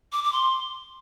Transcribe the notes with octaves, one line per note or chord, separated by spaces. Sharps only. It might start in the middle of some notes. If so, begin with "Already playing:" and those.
D6
D6
C6